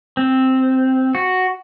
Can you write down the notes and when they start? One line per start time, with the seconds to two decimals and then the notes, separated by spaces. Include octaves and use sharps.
0.17 C4
1.15 F#4